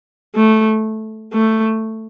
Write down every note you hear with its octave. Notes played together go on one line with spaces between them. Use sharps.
A3
A3